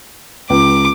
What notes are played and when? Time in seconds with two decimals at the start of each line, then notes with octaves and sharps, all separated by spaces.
0.50 C#2 D6